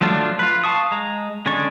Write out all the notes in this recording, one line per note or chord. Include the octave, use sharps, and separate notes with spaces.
F3 F#3 A3 D4 F4
F4 B4
F5 A5 C#6 D#6
G#3 A#5
D3 G#3 C#4 D5 C#6